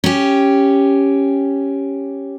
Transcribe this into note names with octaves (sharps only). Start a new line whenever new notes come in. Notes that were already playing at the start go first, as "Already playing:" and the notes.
C#4 G4